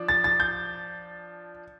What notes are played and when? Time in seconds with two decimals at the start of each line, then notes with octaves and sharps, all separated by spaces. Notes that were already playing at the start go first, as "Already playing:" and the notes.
Already playing: F3 D4
0.09 A6
0.24 A6
0.40 G6